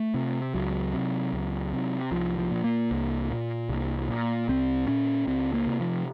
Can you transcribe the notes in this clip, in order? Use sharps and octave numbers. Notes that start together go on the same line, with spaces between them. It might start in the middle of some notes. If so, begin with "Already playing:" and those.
Already playing: A3
C3
C#2 F#3
C3
C#2
C3
C2 F3
F3
A#2
A#3
C2
A#2
C2
A#2
C2 C4
A#2 C#4
C#2 C4
A#3
C3
F3